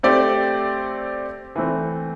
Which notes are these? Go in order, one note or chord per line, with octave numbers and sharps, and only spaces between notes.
A3 C4 G4 D5
E3 A3 C4